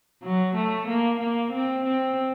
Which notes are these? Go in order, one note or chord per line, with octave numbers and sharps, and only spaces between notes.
F#3
A3
A#3
A#3
C4
C4